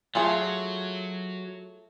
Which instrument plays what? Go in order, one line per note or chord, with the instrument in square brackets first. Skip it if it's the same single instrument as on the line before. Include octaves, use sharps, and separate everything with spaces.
[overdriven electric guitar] F#3 [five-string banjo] A3 F4 G#4